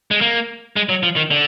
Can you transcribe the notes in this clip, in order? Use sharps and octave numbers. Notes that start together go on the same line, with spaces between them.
G#3
A#3
G#3
F#3
F3
D#3
D3